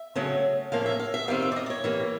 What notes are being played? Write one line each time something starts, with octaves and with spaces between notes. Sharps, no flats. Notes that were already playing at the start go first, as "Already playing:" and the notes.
Already playing: E5
C#3 F#3 A3 C#4
A2 F3 A#3 C#4 F5
E5
F5
E5
D#3 G3 C4 F5
E5
D5
D#5
D5
C#5
E3 G3 A#3